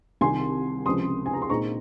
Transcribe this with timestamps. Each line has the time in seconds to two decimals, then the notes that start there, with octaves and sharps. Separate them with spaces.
0.21 C2 C3 D#3 G#5 C6
0.86 C#2 C3 F3 C6 D#6
1.26 G#5
1.33 A#5
1.42 C6
1.50 A#2 G#3 C4 D#4 A#5 C#6